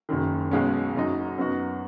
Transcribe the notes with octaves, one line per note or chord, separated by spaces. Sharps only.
F#1 F#2 D#3
B1 B2 G#3 C#4
F#1 F#2 F#3 D#4
F#2 F#3 B3 D#4 F#4